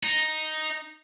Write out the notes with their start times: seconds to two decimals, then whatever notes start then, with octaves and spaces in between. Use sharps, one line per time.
0.03 D#4